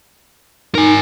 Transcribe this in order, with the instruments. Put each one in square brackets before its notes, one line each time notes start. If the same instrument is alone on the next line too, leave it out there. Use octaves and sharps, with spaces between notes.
[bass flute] D#4 [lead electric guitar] A#4 G#5